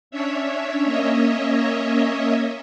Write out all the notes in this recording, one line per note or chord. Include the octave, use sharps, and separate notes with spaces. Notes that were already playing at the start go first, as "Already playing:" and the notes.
C#4 D4 C#5 E5
A#3 C#4 C#5 D#5 E5